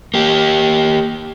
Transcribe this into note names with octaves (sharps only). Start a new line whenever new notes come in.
A#3 G4